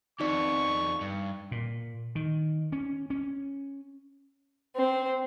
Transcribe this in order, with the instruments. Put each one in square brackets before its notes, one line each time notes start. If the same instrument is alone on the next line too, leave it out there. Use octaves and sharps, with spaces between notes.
[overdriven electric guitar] F2 B3 [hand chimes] D#4 D5 [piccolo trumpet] C#6
[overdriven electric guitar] G2
[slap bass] A#2
D#3
C#4
C#4
[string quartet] C4